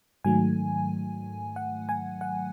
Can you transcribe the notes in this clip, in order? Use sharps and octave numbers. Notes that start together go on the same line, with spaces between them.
G#2 D#3 F#3 A3 G#5
F#5
G#5
F#5